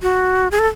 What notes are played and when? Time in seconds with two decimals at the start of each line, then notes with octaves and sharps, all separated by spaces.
0.02 F#4
0.51 G#4
0.59 A4